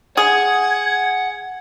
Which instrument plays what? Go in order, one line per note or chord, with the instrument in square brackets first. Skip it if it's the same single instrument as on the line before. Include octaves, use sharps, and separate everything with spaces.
[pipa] G#4 [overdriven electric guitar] F#5 [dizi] G#6